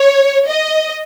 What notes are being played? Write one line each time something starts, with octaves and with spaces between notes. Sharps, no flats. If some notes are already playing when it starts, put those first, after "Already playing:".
Already playing: C#5
D#5